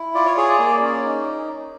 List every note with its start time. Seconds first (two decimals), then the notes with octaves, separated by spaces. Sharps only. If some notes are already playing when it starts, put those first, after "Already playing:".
Already playing: E4
0.15 F4 D5
0.26 C#5
0.37 G#4 C#5
0.48 D5
0.59 A#3 D5
0.82 C#4
1.04 D#4